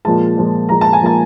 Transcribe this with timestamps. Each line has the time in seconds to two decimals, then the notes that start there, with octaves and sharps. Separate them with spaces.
0.05 A#2 F3 G#3 A5
0.37 A#2 F3 G#3
0.69 A#2 F3 G#3 A#5
0.81 A5
0.93 G#5
1.01 A#2 F3 G#3 A5